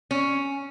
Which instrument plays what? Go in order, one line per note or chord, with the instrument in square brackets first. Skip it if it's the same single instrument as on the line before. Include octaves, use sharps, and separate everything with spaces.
[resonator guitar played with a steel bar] C#4